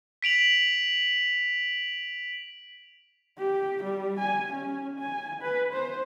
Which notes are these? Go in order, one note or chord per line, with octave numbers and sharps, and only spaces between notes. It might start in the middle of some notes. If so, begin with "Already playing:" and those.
B6 D7 F7 F#7
G4
G3
G#5
C#4
G#5
B4
C5